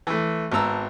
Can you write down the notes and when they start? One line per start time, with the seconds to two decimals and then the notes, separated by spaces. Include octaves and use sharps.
0.07 E3 A3
0.52 G#1 B3 A5 A#5 E6